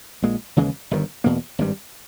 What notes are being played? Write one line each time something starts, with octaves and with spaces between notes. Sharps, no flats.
A#1 A#2 G#3
D#2 C#3 E3 G#3
G1 G2 D#3
E2 B2 A#3
G#1 G2 G3